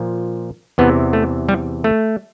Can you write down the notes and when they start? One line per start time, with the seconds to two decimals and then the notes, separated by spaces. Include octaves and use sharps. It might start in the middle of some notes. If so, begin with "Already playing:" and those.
Already playing: A#2 F3
0.78 E2 C3 E3 B3
1.13 A3
1.49 G3
1.84 A3